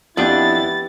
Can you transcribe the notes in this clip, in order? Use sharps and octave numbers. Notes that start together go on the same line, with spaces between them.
F2 B3 D4 E4 G4 A6